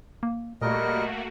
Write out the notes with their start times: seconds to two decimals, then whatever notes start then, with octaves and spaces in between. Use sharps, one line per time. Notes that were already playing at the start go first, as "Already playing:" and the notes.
0.23 A#3
0.62 A#2 G3 A3 A#3 F#4 A#4 D#5